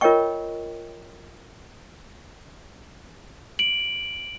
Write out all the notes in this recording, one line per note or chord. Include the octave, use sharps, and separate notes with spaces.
F4 A#4 C#5 D#5 G5 C#6
D7 F#7